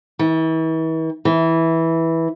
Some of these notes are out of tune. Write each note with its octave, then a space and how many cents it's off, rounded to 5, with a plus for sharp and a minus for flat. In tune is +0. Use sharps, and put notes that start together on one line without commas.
E3 -40
E3 -10